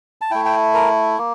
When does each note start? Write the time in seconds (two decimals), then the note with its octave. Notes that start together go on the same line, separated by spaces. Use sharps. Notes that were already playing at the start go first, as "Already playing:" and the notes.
0.21 A5
0.31 A3 E4 G5
0.45 G5
0.74 A#4
1.18 A#3